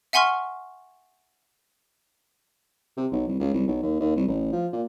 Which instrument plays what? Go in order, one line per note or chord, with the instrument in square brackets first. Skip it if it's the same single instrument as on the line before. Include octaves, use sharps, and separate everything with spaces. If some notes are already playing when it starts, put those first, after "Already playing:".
[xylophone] E5 F#5 G#5 C6 C#6 F6
[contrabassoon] C3
B1
C2
C#2
C2
B1
D#2
D#2
C2
A1
F3
A#2